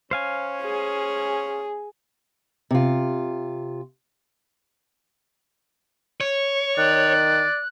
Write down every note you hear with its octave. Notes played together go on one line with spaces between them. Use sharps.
C#4 C5 F5 G#5
G#4
C3 F4
C#5
D#3 D5 F#6